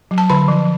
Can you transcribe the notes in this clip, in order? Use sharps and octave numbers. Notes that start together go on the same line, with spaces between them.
F#3
A5
D3 B5
F3